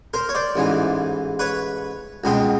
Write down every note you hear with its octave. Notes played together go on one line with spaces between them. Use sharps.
A#4 C5
C#5
C5 D5
A1 G#2 E3
B4 C#5
C#2 B2 G#3 C4